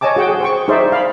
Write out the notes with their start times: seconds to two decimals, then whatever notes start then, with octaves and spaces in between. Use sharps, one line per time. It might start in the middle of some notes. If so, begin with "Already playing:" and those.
0.01 C#5 D#5 G#5 A5 D6
0.16 F#4 G#4 F#5 G5
0.29 G#4
0.41 C5 G5 C#6
0.68 D#4 G#4 C5 D5 E5
0.92 F5 B5